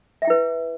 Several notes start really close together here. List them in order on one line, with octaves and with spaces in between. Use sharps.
E5 G5 E4 B4